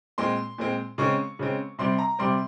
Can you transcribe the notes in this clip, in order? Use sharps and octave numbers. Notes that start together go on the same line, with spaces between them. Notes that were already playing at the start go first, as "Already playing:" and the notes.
A#2 G#3 C4 C6
A#2 G#3 C4
C#3 G#3 C4 C#6
C#3 G#3 C4
C3 G3 C4 C6
A#5
C3 G3 C4 C6